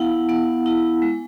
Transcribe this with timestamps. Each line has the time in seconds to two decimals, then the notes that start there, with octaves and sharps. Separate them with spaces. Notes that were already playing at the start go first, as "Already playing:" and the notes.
Already playing: B3 E4 F5 F#5
0.29 B3 F#5
0.66 E4
1.02 G#3